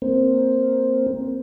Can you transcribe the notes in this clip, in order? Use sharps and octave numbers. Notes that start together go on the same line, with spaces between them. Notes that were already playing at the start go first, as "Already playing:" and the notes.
A#3 C4